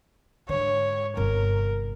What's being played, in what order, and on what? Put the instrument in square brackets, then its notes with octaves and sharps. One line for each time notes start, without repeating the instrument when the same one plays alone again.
[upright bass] G#2 D3 [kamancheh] C#5
[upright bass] G1 C3 [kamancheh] A#4